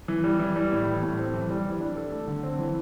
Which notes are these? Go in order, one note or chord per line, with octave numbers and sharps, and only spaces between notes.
E3
G3
E3
G3
A2
E3
A2
C4
E3
G3
E3
D4
A4
A3
D3
C4
E3